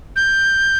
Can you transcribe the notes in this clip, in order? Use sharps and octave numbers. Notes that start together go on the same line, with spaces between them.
G6